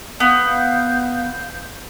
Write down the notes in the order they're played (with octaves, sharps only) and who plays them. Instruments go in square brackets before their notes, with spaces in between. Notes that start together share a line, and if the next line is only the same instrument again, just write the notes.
[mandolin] B3 [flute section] F5 G6